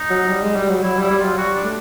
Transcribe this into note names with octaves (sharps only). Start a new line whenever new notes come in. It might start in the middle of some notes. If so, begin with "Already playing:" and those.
Already playing: D#4
F#3
G3
G#3
G3
F#3
F#3 E4
G3 E4
G3
F#3 F4
G3 F#4
D4
A3